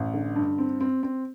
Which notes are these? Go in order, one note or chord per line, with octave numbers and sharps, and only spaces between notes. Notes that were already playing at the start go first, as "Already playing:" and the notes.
Already playing: A1
D3
G2
C4
C4
C4